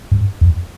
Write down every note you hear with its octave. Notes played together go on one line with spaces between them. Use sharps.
G2
F2